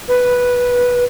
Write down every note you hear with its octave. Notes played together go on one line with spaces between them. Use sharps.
B4